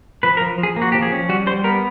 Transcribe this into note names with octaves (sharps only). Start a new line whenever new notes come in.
F3 B4
A#4
F3
F3
G#4
A#3
F#4
F3 G4
G#4
C#4
G3 F#4
G3 C5
B3 A#4